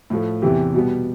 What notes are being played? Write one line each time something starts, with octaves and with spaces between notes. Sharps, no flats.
A2 F3 A3
E2 C3 E3 G4
B2 G3 B3